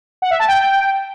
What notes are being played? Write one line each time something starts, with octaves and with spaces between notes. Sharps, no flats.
F#5
E5
A5
G5